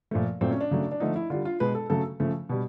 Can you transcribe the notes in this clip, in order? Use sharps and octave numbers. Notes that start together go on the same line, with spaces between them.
A#2 F3 A3
A#2 F#3 A3 C4
C#4
D4
C#3 F#3 A3
D4
D3 F3 A3 D#4
E4
D3 G3 F4
F4
B2 G#3 B4
A4
C#3 F#3 A3 A4
C#3 F3 A3
B2 G3